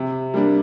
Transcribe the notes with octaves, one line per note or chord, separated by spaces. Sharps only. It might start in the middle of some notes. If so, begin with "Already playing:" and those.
Already playing: C3
G3 A#3 D4